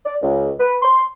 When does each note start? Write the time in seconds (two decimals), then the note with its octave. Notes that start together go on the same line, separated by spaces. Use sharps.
0.06 D5
0.22 C#2
0.60 B4
0.83 C6